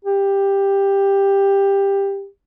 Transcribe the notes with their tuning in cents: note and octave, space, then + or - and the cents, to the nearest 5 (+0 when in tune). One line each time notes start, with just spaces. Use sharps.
G4 +10